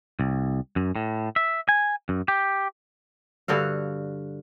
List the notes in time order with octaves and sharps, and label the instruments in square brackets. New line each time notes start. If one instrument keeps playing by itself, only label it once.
[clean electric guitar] C2
F#2
A2
E5
G#5
F#2
G4
[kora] G2 D3 F#4 F5